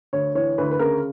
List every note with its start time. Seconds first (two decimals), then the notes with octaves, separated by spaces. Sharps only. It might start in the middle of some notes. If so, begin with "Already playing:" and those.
0.13 D2 C#5
0.35 E3 C#5
0.58 D2 B4
0.71 B4
0.79 C#3 A#4